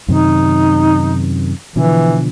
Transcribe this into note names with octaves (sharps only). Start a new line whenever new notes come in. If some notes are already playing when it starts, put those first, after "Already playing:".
F#2 C3 D#3 D#4
B2 D3 E3 F3